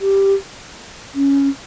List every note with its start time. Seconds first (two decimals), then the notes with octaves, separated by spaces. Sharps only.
0.01 G4
1.14 C#4